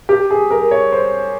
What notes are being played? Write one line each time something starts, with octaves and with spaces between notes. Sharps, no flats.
G4
G#4
A#4
C#5
C5